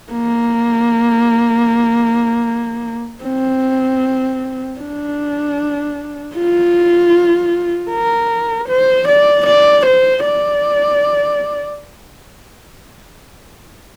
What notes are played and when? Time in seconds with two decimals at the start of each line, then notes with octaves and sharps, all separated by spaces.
0.12 A#3
3.24 C4
4.79 D4
6.35 F4
7.91 A#4
8.69 C5
9.08 D5
9.47 D5
9.86 C5
10.25 D5